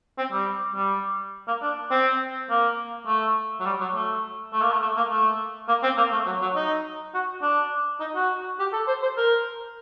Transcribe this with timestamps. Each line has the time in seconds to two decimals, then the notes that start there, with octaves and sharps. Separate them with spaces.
0.18 C4
0.32 G3
0.75 G3
1.48 A#3
1.62 D4
1.91 C4
2.50 A#3
3.07 A3
3.60 F#3
3.66 G3
3.80 F#3
3.95 A3
4.53 A3
4.62 A#3
4.72 A3
4.82 A3
4.97 A#3
5.10 A3
5.68 A#3
5.83 C4
5.98 A#3
6.12 A3
6.26 F#3
6.42 F#3
6.56 D#4
7.14 F#4
7.42 D4
8.00 D#4
8.15 F#4
8.59 G4
8.73 A4
8.88 C5
9.02 C5
9.17 A#4